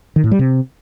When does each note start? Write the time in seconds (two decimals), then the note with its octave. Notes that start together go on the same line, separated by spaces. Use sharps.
0.16 D#3
0.24 A2
0.31 G3
0.39 C3